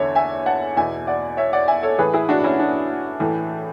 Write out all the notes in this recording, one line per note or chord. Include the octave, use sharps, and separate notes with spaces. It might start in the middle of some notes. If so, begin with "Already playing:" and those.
Already playing: E2 D3 C#5 E5
E5 G#5
F#5 A5
E2 B2 E5 G#5
D5 F#5
C#5 E5
D5 F#5
E5 G#5
A4 C#5
A2 E3 G#4 B4
E4 G#4
D4 F#4
C#4 E4
D4
A2 E3